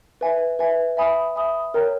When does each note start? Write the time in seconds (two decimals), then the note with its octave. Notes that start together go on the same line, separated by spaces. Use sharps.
0.21 B4 E5 G#5
0.59 B4 E5 G#5
0.97 E5 G#5 B5 D#6
1.36 E5 G#5 B5 D#6
1.74 A#4 C#5 G5 A#5